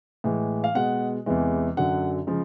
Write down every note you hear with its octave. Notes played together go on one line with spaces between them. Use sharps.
A2 E3 G#3
F5
B2 G#3 F#5
E2 C3 E3 G#3
F#2 D3 F#3 F#5
C#3 F3 G#3